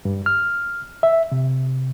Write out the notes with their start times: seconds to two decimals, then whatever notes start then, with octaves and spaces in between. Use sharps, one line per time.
0.05 G2
0.26 F6
1.03 E5
1.32 C3